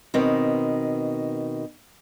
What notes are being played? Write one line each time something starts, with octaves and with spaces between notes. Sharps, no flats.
B2 D#3 C4